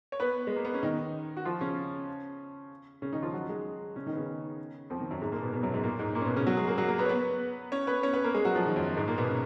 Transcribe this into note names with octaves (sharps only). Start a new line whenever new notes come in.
C#5
B3 B4
G#3
A#3
B3
C#4
D#3 D#4
F#4
F3 F4
C#3 C#4
C#3 C#4
D#3 D#4
F3 F4
F#3 F#4
G#3 G#4
C#3 C#4
D#3 D#4
B3
C#3 C#4
F2 F3
D#3
F#2 F#3
G#2 G#3
A#2 A#3
B2 B3
B2 B3
F#2 F#3
G#2 G#3
A#2 A#3
G#2 G#3
A#2 A#3
C#4
B2 B3
C#3 C#4
F#3 F#4
G#3 G#4
A#3 A#4
F#3 F#4
A#3 A#4
B3 B4
C#5
B3 B4
C#4 C#5
B3 B4
C#4 C#5
B3 B4
A#3 A#4
G#3 G#4
F#3 F#4
F3 F4
D#3 D#4
F#2 F#3
G#2 G#3
A#2 A#3
B2 B3
C#3 C#4